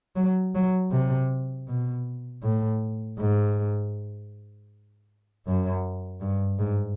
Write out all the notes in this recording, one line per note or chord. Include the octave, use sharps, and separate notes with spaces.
F#3
F#3
C3
B2
A2
G#2
F#2
G2
G#2